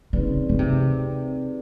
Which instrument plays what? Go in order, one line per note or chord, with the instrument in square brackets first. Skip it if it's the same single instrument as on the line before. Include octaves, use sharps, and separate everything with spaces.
[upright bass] C#3 [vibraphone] C4 D#4 G#4 B4 D5
[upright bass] C#3
C3